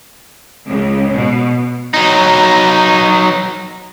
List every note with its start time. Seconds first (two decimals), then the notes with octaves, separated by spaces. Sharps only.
0.66 C#2
1.14 B2
1.94 F#3 D#4